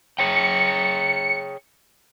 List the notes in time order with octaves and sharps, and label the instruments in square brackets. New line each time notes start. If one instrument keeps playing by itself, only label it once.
[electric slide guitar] G#4 C#5 G5 [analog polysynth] C#7